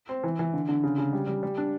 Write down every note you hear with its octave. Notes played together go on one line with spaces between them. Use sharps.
C4
E3
E3
D3
D3
C#3
C#3
G3
G3
G3
D4